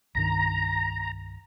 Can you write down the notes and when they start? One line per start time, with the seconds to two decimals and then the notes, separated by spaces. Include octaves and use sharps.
0.15 C2 G2 D#3 A#5